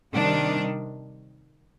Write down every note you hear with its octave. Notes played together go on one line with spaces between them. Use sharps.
C3 D#3 G3 D4